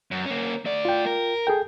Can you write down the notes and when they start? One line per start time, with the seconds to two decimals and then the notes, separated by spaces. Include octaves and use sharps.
0.11 F#2
0.26 A#3 C#4
0.65 A3 D5
0.85 F4 G5
1.06 A#4
1.47 G#4 A4 G5